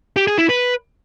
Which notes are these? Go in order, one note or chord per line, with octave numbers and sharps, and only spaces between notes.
G4
G#4
E4
B4